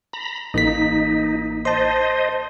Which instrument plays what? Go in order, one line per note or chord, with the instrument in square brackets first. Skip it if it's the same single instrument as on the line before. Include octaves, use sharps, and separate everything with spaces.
[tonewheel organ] A#5 B5
[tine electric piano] A1 A#3 B6 [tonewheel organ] D#4
[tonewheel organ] C5 D#5 [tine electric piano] A5 C6